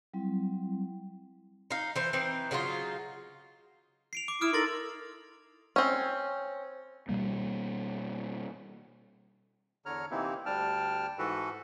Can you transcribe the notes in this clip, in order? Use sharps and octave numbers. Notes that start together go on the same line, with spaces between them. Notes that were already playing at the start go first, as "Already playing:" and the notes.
F#3 G3 C4 E4
D#4 F5
E3 C5
E3 C4 D#4
C#3 F#3 D#4 F4
C7 D7 F7
D6
E4 D#6 F6 D7
D#4 A4 A#4 C6 A6 F#7
C4 C#4
B2 G3 A#3
E2 D3 C#5 A#5 F6
C3 E3 A#3 C4 D#4 E4
D2 G3 D4 G5 A5 F6
G#2 E3 F#4 A4 B4